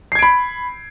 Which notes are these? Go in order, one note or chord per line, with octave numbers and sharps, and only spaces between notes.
B5 G#6 C7 D7